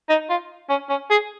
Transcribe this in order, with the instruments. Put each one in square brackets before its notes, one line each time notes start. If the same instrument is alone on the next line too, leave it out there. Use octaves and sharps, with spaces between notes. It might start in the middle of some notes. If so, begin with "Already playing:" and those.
[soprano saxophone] D#4
F4
C#4
C#4
G#4